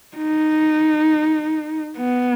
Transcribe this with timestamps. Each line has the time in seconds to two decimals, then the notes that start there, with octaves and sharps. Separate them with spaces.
0.17 D#4
1.97 B3